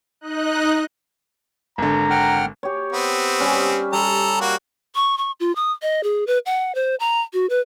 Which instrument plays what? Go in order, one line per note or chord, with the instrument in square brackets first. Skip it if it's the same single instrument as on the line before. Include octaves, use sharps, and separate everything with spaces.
[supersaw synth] D#4 D#5 F#6
[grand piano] G#1 D3 [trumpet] A#5
[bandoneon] F#5 G5 F6
[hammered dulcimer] G4 C#5
[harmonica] B3 C4
[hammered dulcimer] G3 C#4
[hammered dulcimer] G3 [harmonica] A4 A#5
[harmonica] A#3 F#4
[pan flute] C#6
C#6
F4
D#6
D#5
G#4
B4
F#5
C5
A#5
F#4
B4